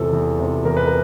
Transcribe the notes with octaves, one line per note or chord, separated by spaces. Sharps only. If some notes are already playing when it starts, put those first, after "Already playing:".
Already playing: E2 C3 F3 A4
E2
C3 F3
E2 A#4
B4
A#4